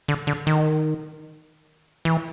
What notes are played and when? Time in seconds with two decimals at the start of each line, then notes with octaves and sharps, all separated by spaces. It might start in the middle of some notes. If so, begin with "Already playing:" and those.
0.08 D3
0.27 D3
0.47 D#3
2.05 E3